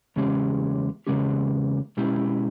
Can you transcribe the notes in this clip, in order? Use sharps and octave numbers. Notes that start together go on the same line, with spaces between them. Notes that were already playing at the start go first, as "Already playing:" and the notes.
E2 C#3 G#3 C#4 G4
E2 C#3 G#3 C#4 G4
B2 G#3 C#4 E4 G4